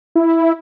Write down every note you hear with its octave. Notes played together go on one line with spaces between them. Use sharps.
E4